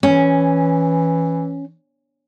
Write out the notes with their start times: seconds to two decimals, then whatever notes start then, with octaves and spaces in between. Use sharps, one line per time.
0.03 E3 C#4